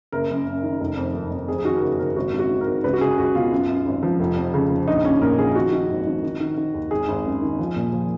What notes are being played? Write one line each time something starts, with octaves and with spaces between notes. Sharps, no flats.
F#1 A#4
F#2
F#2
D#3
F1
F2
F1
F2
F2 G#4
G#4
D#3 F#4
A#4
F#1 G#4
F#1 A#4
G#1 F#4
G#1
F#4
D#3
A#4
G#1
C#2 B4
F#4
C#2 G#4
C#2 F#4
B2 F4
F#2
F#2
G#1
F3
F1
F2
C#3
F1
A#1 D#4
A#1 C#4
A#2 A#4
F3 G#4
D#3 F#4
D#3
G#1
D#3
D#3
D#3
D#3
D#2
G#1 G#4
G#1
F#2
D#3
F3
A#2
F3